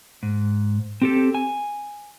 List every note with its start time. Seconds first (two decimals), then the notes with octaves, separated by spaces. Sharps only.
0.23 G#2
1.02 C4 G4 A4
1.34 G#5